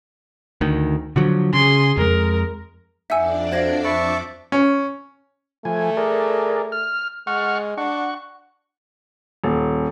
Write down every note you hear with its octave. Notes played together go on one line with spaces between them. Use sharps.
D2 D#3
D3 F3 F#3
C#3 G#4 C6
F2 G#3 A#4
F2 D4 D#4 D5 E5 F#5 G#5 E6
F#4 C5 F5 G#6 A#6
F3 B4 E5 A5 C#6 D6
C#4
F3 A3 G#5
G#4 A#4 D5
F6
G#3 F#5 C#6 F6
D4 F#5 C#6
D#1